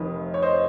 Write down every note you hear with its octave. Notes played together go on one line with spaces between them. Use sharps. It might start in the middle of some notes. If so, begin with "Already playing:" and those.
Already playing: F1 F2 D#3
C#5
C5 D#5